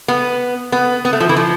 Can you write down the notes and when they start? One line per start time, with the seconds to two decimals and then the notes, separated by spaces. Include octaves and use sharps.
0.08 B3
0.72 B3
1.05 B3
1.13 A3
1.20 F3
1.29 E3
1.36 F3